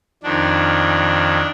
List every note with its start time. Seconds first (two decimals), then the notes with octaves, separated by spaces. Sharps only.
0.23 F2 D#3 D4